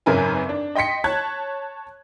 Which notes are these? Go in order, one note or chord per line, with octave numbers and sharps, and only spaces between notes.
G#1 F#2 C#3 A#4 B4 G#5
D4
D#5 G5 C6 B6 C#7
C#5 A5 F#6 G#6